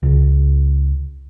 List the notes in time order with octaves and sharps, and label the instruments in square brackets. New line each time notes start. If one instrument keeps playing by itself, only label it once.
[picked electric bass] C#2